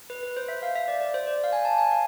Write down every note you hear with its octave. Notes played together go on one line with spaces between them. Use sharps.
B4
B4
C5
E5
F5
E5
D5
D5
C5
D5
F5
G#5
A5
G#5
F5